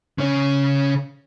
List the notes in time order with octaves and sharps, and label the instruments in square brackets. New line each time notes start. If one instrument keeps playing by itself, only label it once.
[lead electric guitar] C#3 C#4